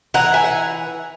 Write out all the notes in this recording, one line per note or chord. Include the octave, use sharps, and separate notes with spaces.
E3 F#5 A#5
E5 G#5
F#5